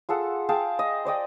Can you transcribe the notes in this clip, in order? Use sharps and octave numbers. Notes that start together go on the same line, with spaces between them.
F4 G#4 A4 F#5
G#4 F5 G5 A5
D#5
C5 D5 D#5 G5